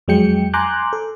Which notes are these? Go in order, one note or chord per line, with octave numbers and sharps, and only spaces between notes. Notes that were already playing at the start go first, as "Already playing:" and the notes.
F2 F#3 G#3 G5 C#7
G#5 A#5 C6 D6 F#6 G6
A4